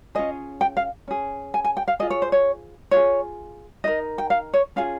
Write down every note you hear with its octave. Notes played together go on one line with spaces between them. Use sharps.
C#4 F4 G#4 D#5
G5
F5
C#4 G#4
G#5
G#5
G5
F5
F4 G#4 D#5
C#5
C5
C#5
F4 G#4 C#5
D#4 A#4 D#5
G5
F5
C#5
C#4 F4 G#4 F5